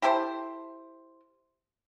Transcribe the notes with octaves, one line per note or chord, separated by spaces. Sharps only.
E4 G4 A4 C5